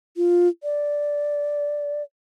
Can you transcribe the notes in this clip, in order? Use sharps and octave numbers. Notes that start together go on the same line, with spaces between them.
F4
D5